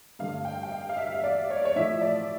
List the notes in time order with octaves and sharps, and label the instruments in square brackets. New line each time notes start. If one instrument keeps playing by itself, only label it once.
[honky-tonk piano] G2 D3 A3 F5
G5
G5
F5
F5
E5
F5
E5
D5
C#5
D5
C#5
A2 F3 A3 E5
D5